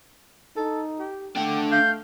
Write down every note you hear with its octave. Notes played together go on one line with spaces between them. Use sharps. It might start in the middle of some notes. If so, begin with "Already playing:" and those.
D#4 A4
G4
A3 D4 F#5 G5
F5 G6